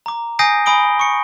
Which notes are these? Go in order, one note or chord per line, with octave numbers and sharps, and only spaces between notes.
A#5 D6
G#5 D#6 G6 A#6 C7 D7
G#5 B5 D#6 D7 G7
C#6 C#7